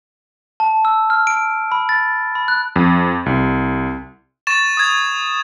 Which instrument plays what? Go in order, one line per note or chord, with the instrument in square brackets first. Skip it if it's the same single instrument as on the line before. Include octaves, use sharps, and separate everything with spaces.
[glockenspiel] A5
E6
F6
D7
B5
A6
B5
F#6
[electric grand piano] F2
C2
[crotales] C#6 A6 E7
D#6 G#6